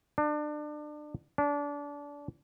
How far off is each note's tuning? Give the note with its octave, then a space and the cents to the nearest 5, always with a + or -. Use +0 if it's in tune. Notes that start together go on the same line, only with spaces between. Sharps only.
D4 +30
D4 -25